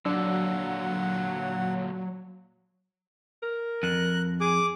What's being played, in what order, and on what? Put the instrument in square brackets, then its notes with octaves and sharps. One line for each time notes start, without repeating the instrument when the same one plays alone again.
[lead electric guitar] A#2 D3 [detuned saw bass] F#3 [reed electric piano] D4 E6 [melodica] F#5
[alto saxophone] A#4
[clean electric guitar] F2 [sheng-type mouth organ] F#6
[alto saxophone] G#4 [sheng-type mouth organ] D6